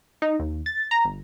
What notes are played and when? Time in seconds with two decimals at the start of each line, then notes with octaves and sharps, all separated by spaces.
0.22 D#4
0.40 D#2
0.66 A6
0.91 A#5
1.05 G1